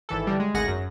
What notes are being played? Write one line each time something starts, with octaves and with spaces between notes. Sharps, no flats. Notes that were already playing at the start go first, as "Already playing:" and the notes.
G#1 E3 A4
D3 E3 G3
G#3
G#1 D2 G#4 F#5 A#6
F#2